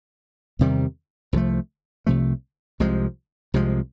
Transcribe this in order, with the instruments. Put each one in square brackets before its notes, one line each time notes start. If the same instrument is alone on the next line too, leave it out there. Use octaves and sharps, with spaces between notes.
[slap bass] E2 C3 D#3 G3
C2 C3 F3 A3
C2 C3 F3 A3
C2 C3 F3 G#3
C2 C3 F3 G#3